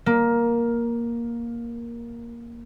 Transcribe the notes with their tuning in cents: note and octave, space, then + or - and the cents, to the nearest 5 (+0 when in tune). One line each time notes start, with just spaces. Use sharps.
A#3 +10